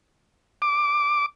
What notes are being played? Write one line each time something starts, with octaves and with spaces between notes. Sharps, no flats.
D6